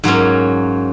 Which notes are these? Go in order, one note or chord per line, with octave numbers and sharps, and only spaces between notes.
G#2 F#3 A#3 C#4